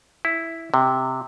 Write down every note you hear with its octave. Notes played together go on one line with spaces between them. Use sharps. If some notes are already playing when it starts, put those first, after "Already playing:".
E4
C3